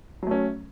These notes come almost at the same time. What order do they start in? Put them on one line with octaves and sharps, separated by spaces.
F#3 A3 C#4